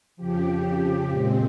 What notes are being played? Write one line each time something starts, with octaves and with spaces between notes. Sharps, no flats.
F2 C#3 F3 G4
A#2 G#3 C4